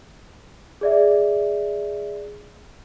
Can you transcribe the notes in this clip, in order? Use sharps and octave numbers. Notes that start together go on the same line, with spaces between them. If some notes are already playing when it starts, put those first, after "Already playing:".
G#4 D5 E5